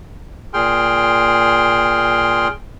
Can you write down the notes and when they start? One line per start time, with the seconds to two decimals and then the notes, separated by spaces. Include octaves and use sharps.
0.54 A#2 G#4 G5 C6 F6